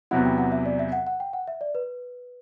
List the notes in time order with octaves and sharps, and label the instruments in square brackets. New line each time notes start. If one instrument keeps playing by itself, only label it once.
[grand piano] E2 C3 F#3 B3 E4 [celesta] F#5
[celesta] G5
F#5
E5
D5
E5
F#5
F#5
G5
F#5
E5
D5
B4